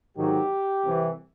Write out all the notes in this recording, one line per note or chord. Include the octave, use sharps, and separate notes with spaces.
G#2 D#3 F#3 G4
C2 C3 E3